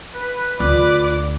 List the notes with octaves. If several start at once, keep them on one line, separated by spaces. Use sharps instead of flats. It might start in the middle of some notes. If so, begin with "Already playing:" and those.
B4
D2 F4 D5